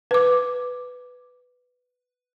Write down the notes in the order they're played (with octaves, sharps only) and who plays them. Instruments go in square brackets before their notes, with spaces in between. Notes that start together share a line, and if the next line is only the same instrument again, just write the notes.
[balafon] B4 D6